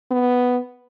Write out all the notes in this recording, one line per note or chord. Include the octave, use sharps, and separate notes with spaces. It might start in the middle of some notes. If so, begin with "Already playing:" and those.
B3